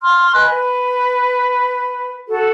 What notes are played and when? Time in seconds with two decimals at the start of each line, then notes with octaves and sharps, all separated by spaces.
0.02 C6 F6
0.34 B4 D#5 G#5 F#6
0.50 B4
2.27 F#4 A4